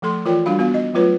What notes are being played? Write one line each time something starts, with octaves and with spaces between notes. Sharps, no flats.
F3 A3 A4 C6
E3 F4 A#4 C#5 D5 G5
G3 D4 F#4 F5 B5
B3 F#4 F5
D#5
F#3 A3 F4 B4 C#5